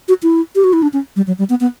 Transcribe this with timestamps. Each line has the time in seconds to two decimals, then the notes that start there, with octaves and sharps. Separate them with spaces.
0.08 F#4
0.23 E4
0.55 G4
0.64 F#4
0.73 E4
0.82 D4
0.93 C#4
1.16 G3
1.27 F#3
1.39 G3
1.50 B3
1.61 B3